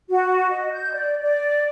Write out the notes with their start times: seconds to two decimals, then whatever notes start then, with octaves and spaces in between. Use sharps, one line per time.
0.10 F#4
0.50 D#5
0.72 G6
0.94 D5
1.22 D5